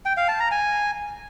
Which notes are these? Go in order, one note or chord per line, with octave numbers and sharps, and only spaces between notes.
G5
F5
A5
A#5
G#5